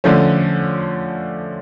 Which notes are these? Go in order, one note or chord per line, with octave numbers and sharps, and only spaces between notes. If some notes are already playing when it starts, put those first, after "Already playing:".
D3 F3 A3 C#4